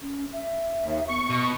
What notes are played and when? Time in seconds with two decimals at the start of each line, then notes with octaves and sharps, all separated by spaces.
0.02 C#4
0.33 E5
0.82 D#2
1.09 B3 C#6
1.30 B2